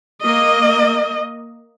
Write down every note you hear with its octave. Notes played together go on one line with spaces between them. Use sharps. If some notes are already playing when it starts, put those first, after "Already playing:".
A#3 D#5